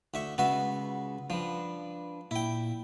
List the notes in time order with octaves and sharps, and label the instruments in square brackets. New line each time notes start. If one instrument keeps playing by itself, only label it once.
[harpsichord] D2 E5 C#6
[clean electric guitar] C#3 G#3 [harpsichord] B3 F#4 E5
[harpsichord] F3 [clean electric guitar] D4 B4
[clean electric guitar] A#2 [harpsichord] E4 G5